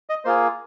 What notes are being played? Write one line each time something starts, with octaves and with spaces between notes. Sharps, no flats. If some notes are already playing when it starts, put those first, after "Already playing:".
D#5
A#3 F4 G#4 C5